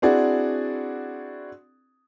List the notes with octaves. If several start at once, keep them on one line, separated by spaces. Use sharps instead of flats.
C4 D4 E4 F#4 G#4 D5